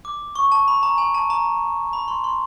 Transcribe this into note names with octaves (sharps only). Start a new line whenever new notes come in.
D6
C#6
A5
B5
A#5
G#5
A5
A#5
B5
C6
C6